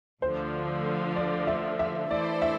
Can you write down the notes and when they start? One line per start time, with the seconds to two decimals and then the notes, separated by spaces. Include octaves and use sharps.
0.22 D2 D3 F3 C5
1.16 D5
1.47 E5
1.79 E5
2.10 E3 A3 E4 A4 C5 D5
2.42 E5